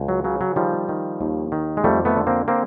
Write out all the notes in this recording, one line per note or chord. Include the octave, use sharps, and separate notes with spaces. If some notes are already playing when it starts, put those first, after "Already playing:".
Already playing: C#2
F#3
C#3 F#3
F#3
D#3 F3 G3
D#3
D#2
D#3
G#3
F2 G3 A3
A3 B3
D3
A#3 C4
A#3 C4